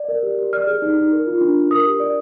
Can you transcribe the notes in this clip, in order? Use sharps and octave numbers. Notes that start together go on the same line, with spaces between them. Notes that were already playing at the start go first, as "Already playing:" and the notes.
Already playing: D5
A#4
G4
G4
D5 F6
G#4
D#4
D#4
A#4
F4
D4
D4
A#4 D#6
G4
D5